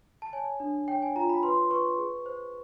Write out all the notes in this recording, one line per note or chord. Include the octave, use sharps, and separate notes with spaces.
A5
C#5 G#5
D4
C#5 G5
G#5
F4 A#5
B5
B4 C6
B4 C#6
G#4
C5